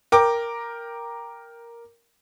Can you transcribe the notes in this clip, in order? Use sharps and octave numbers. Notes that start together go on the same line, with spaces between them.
A#4 G5 D6